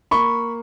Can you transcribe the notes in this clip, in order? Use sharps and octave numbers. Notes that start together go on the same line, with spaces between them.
A#3 B5 C#6